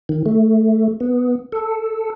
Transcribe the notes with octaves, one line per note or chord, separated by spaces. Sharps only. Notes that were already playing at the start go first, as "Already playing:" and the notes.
D#3
A3
B3
A4